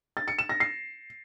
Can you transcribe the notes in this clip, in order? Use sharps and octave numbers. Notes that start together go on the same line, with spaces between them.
A6
C#7
E7
A#6
C7